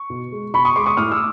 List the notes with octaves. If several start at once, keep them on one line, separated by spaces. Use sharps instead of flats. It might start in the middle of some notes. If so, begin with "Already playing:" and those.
Already playing: C#6
B2
G#3
B2 B5 C#6
C#6 D#6
G#3 C6 D6
C#6 D#6
A2 D#6 F6
D6 E6